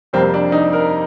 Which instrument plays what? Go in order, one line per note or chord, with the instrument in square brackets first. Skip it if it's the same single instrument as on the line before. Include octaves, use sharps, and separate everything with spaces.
[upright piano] F2 C3 G3 A#3 C4
D4
D#4
A#4